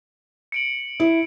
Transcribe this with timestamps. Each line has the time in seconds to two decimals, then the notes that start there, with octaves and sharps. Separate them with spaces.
0.52 C#7 D7 F#7
1.00 E4